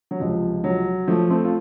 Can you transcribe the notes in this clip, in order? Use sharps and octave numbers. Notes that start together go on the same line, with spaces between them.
F#3
C#2 C3 F3
F#3
F3 A3
A3 C4
F4